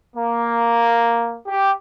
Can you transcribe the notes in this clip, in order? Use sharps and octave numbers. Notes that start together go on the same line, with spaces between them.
A#3
G4